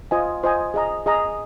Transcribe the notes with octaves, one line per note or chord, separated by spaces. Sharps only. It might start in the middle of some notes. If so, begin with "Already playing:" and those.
F4 C5 D#5 G#5
F4 C5 D#5 G#5
G#4 D#5 A#5
G#4 D#5 A#5